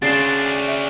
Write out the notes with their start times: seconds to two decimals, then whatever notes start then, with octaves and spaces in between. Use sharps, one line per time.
0.02 C#3 D4 F#4 C6 A6 C7 E7
0.68 E5